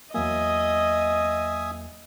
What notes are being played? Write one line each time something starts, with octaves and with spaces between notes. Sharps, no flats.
E2 F#3 A#3 D#5 E5 G#5 D#6